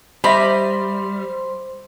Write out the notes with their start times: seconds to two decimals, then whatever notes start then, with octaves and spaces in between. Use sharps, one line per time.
0.24 G3 G4 C5 D#5 E5 B5 C6